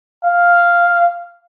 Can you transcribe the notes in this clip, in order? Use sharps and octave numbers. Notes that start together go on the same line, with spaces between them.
F5